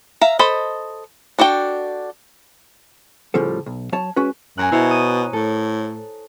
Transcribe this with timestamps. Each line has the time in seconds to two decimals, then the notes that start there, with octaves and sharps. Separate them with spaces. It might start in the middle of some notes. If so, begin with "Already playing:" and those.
0.21 E5 F5 A#5
0.39 A4 C5 D#5 B5
1.39 D4 F#4 A4 G5
3.34 A2 C#3 F3 G3 A4
3.66 B1
3.92 F#3 C#5 A5
4.16 G#3 C#4 F#4 B4
4.58 F#2 G#5 A#5 F#6
4.72 B2 E4 C5 C#5
4.91 D#6
5.33 A2 A4